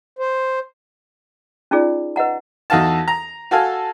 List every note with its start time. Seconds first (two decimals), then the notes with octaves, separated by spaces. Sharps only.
0.19 C5
1.71 C#4 D#4 F4 G#4 D5
2.16 B4 D#5 F#5 A#5
2.70 E2 D#4 F#4 A4 F5 A5
3.08 A#5
3.51 F#4 A4 F5 G#5